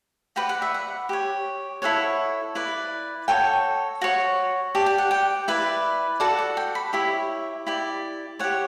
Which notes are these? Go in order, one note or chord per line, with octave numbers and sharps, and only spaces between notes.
F#4 B4 D5 G5
F#5
E5
F#5
G4 C#5
E4 A4 C#5 F#5
E4 B4 D5
F#4 A4 C#5 G5
F#4 C#5
G4 D5 A5
G5
F#5
G5
E4 B4 D5
F#4 A4 D5 F#5
F#5
G5
B5
E4 G4 C#5 E5
E4 G4 D5
G4 C#5 F#5